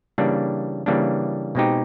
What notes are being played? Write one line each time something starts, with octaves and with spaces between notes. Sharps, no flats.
C#3 E3 G3 A#3 D4
C#3 E3 G3 A#3 D4
B2 G#3 C4 D#4 G4